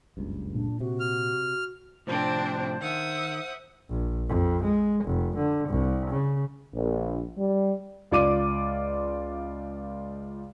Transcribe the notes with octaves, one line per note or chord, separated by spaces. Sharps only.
F#1 C#2 G2
A#2 D4
C3 F#4
F6
A2 C3 F3 C4 D4 C5
D#3 E5 F#5 D#6
A#1
F2
G#3
F1
D3
C2
C#3
A#1
G3
C#2 F4 D5 D6 D#7